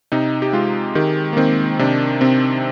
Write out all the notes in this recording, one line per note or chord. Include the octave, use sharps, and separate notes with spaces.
C3 D#4
G4
G#3 F4
D#3 G4
A#3
D#3 C4
C3 D4
C3 C4